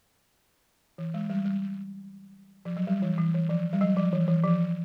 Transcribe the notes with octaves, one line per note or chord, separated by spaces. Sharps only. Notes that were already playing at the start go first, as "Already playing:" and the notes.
E3
G#3
G3
G3
F3
F#3
G3
E3
E3
E3
F3
G3
F#3
F3
E3
E3
F3